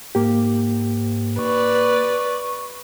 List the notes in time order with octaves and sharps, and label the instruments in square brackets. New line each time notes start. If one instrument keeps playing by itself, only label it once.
[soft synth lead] G#2 [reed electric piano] A#3 G4
[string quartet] B4 D5 [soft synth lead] C#6